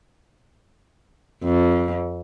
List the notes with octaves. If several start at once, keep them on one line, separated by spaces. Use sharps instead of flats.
F2